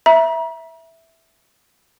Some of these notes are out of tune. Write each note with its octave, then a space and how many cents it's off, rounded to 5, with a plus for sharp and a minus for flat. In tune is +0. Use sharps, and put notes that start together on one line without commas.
E5 -5 A#5 +35